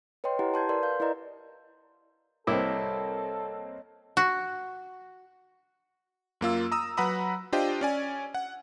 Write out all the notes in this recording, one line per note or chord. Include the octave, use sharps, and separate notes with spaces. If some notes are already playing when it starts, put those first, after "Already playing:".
B4 C#5 D#5 G5 C6
E4 G4 B4 F#5 A#5
A5 C6 G6 G#6
A#4 B4 D5 C6
F5 G6
E4 A#4 B4 D5 D#5 A#5
C2 A#3 C4 E4 A4 C#5 D#5 D6
F#4
F#2 A#3 F4 E6
A#5 D#6 E6
F#3 B4 F#5 A#5 B5 D#6
D4 F4 G4 C5 D#5 G5
C#4 D5 G#5
F#5